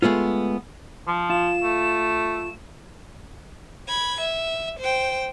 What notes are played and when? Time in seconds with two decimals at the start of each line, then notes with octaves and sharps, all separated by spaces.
0.02 G#3 A3 B3 F4
1.07 F3
1.30 F4 E7
1.63 A3
3.88 B5 G#6
4.21 E5
4.79 C5 G5